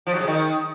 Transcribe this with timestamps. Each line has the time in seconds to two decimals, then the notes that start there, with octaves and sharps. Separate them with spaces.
0.07 F3
0.13 F#3
0.20 C#3
0.27 D#3